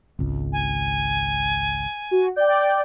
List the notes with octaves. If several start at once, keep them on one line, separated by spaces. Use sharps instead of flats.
G#1 C#2
G#5
F#4
D5 G5 G6